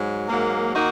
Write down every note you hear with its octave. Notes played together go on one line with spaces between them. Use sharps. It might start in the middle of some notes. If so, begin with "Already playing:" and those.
Already playing: G#2 F#3
G#2 F#3 A#3
D#3 A#3 D#4 F#4